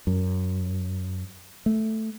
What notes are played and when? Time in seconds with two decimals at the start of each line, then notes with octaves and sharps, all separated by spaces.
0.07 F#2
1.66 A3